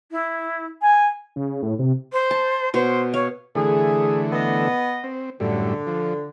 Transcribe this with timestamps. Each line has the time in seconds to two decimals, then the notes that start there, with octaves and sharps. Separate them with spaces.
0.11 E4
0.81 G#5
1.36 C#3
1.63 A2
1.79 C3
2.12 C5
2.31 A5
2.74 B2 C5 C#5
3.14 C#5 F5
3.55 D3 E3 A3 G#4
4.31 B3 D#5
5.04 C4
5.40 F#2 A2 D3 G3
5.87 F3